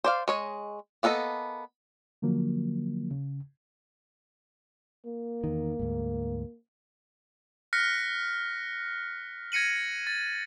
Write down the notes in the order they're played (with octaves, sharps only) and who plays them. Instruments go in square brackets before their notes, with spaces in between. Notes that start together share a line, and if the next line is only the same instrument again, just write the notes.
[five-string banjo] C5 D5 F5
G#3 C#5 D#5
A#3 B3 A4 B4 D#5
[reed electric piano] D3 F3 F#3 A#3
C#3
[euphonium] A#3
[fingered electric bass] E2 D#3
D2 G#2
[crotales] F6 F#6 A#6 B6 C#7
G#6 A#6 C#7 D#7 F#7
A6